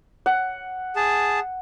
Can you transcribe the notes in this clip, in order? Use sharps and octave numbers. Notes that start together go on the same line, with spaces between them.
F#5
G#4 A5